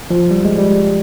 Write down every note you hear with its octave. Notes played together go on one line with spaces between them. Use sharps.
F3
G3
G#3
G3